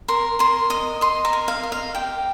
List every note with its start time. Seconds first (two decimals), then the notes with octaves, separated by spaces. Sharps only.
0.08 A#4 C6
0.39 A#4 C6
0.70 D#5 D#6
1.01 D#5 C6
1.25 A#5
1.33 A#4
1.48 F5
1.63 D#5
1.72 F5
1.95 G4 G5